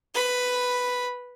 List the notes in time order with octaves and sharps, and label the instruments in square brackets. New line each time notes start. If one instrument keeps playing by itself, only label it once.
[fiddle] B4 B5